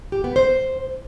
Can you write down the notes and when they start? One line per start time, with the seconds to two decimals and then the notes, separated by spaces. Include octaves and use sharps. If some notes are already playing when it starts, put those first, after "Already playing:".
0.12 G4
0.24 B3
0.36 C5